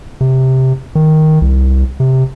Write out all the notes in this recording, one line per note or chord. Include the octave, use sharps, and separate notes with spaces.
C3
D#3
C2
C3